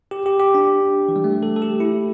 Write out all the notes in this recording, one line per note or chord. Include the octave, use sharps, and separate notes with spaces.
G4
G4
G4
D4
E3
G3
A3
A4
A4
G4
E4